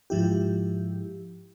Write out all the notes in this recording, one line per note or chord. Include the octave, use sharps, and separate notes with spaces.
G#2 F3 E4 G4